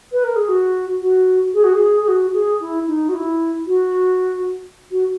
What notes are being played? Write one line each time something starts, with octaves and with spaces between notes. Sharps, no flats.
B4
A#4
G#4
F#4
F#4
G#4
F#4
G#4
G#4
F#4
G#4
E4
D#4
F#4
E4
F#4
F#4